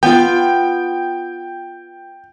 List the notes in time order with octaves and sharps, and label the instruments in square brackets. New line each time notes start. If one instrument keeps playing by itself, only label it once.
[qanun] B3 F4 [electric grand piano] G5